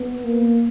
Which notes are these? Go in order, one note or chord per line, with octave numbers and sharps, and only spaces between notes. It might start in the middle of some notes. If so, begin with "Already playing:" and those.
Already playing: B3
A#3